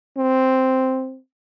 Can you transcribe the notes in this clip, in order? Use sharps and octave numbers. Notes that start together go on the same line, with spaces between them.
C4